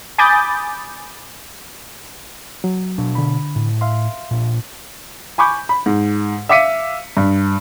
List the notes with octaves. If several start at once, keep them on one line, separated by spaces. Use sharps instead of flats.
G#5 B5 D6 D#6 G6 A6
F#3
B2 D4
D3 B5
A2
E5 F5 C6
A#2 D4
G#5 B5 C#6 D6 G6
B5
G#2
E5 F5 D6 B6 C#7 D#7
G2